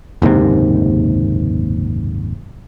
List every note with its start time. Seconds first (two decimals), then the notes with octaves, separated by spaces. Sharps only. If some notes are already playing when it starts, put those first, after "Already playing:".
0.22 F#1 D#2 G#2 C3